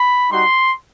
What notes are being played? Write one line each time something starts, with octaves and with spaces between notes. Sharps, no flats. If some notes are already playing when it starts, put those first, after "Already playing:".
Already playing: B5
G3 D#4 F#4 C6